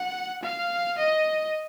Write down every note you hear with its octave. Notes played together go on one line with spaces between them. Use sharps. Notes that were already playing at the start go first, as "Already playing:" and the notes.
Already playing: F#5
F5
D#5